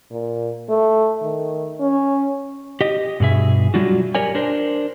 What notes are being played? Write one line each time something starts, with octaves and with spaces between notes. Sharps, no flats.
A#2
A3
D#3
C#4
G4 D#5
G2 B2 G#4 E5
F#3 G3 D4 F4 F#4
G4 A#4 C#5 D5 G#5
D4 A#4 C5